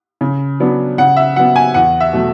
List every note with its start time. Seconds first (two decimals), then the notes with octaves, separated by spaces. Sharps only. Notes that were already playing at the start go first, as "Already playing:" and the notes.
0.21 C#3
0.60 F#3 B3 D4
0.98 C#3 F#5
1.17 E5
1.36 F#3 B3 F#5
1.56 G#5
1.74 E2 F#5
2.01 E5
2.13 B2 F#3 A3